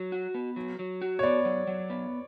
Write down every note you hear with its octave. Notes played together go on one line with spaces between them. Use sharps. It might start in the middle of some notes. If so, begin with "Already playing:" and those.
Already playing: F#3
F#4
B3
F#3
F#3
F#4
C#5
B3 D5
F#3
F#3
B3